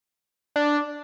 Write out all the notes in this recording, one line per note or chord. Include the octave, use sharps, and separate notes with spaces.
D4